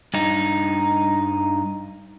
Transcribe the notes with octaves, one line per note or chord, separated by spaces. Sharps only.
G2 D#4